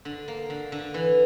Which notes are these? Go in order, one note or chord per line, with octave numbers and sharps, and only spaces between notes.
D3
A#3
D3
D3
E3